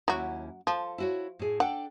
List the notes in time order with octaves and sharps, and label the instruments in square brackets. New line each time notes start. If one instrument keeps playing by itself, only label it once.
[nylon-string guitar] D#2 C#4 E4 [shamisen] F#3 F#4
[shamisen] F3 [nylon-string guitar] A4
[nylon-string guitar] E4 F#4 C#5
A2 G#4
[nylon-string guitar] D4 A4 G5 [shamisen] F#5